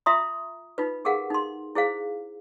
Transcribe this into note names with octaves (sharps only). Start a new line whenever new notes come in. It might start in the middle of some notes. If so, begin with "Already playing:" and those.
F4 E5 A#5 C6 D#6
D#4 F4 B4
G4 G#4 A#4 F5 F#5
D#4 C6
E4 G#4 C5 F5